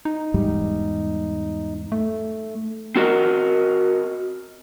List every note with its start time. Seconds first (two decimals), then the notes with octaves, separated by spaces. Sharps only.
0.05 D#4
0.34 E2 G#2 G3
1.92 A3
2.96 C4 F#4 A#4 D#5